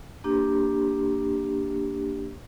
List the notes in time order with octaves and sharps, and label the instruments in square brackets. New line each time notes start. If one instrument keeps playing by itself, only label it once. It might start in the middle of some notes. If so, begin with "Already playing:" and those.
[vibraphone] A#3 D4 G4